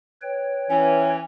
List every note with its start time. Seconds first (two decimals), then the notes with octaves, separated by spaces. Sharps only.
0.22 B4 C#5 G5
0.70 E3 C#4 G#5